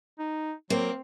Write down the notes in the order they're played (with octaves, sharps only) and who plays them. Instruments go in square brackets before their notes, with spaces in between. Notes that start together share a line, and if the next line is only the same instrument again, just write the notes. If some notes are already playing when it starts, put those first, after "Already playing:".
[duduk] D#4
[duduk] F#3 [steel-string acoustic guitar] A#3 [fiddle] C4